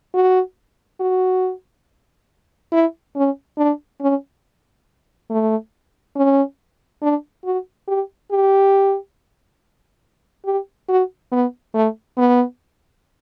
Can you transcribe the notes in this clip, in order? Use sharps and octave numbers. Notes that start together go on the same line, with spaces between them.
F#4
F#4
E4
C#4
D4
C#4
A3
C#4
D4
F#4
G4
G4
G4
F#4
B3
A3
B3